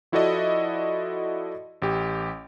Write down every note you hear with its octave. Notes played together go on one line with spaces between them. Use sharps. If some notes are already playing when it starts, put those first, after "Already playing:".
F3 E4 F#4 A4 D5 D#5
A1 G4